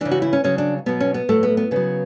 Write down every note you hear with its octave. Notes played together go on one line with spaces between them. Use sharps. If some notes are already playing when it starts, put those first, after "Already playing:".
C#3 E3 D4
F#4
E4
C#4
C#3 F#3 C#4
D4
B2 F#3 B3
C#4
B3
A2 F#3 A3
B3
B3
C#3 F#3 B3